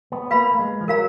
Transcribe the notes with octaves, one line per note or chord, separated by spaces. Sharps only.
B3
A#3 B4 F5 B5
A#3
G#3
F3
F#3 A#4 F5 A#5